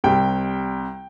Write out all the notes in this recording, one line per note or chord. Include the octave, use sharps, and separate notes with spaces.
C2 C3 G3 G5